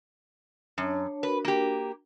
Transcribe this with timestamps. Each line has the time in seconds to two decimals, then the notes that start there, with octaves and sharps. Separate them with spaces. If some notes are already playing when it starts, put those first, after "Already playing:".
0.78 F#2 D4 C#5 A5
1.23 D4 F#4 A#4 B4
1.45 A#3 G4